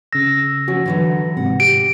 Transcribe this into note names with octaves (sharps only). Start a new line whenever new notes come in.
C#3 E6 A#6
F3 C#4 F#4
D3 E3 F#3
G#2 C3 F#5
G4 D7